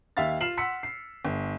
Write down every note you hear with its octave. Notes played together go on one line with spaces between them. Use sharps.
D#2 E5 F5 F6 A6
F4 F6 C7 E7 F#7
F#5 C6 E6 B6 C#7
C7
G1